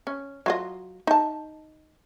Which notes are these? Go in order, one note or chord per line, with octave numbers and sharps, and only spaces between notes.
C#4
F#3 F4 D#5
D#4 A5